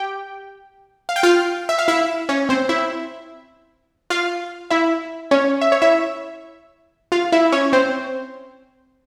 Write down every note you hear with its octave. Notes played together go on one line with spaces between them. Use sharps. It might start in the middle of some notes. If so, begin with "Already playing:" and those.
Already playing: G4 G5
F5
G5
F4 F5
E5
F5
E4 E5
C#4 C#5
C4 C5
E4 E5
F4 F5
E4 E5
C#4 C#5
E5
C#5
E4 E5
F4 F5
E4 E5
C#4 C#5
C4 C5